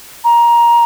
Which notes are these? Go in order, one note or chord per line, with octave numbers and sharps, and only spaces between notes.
A#5